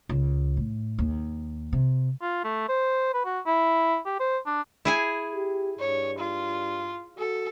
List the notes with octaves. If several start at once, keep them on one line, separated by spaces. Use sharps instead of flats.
C#2
A2
D#2
C3
F4
A3
C5
B4
F#4
E4
G4
C5
D4
E4 G#4 G#5
G4
G2 C#5
F4
F#4 A4